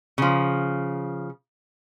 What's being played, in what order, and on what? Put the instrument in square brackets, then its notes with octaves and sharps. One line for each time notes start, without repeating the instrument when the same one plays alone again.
[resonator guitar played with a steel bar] C#3 F3